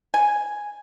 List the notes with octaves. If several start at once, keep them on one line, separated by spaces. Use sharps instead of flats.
G#5